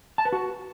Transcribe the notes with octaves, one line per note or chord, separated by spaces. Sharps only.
A5
B4
F#4